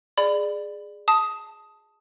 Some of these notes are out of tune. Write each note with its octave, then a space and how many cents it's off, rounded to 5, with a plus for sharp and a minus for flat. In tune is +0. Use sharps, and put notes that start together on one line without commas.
G#4 +0 D5 +15 B5 +25
A5 +0 D#6 +10